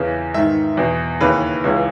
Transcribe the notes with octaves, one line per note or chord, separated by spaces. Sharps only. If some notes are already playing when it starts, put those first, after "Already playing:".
Already playing: E2 C#3 E3
G#2 D#3 E5
E2 B2
D#2 C#3 E3 B4
C#2 C#3 E3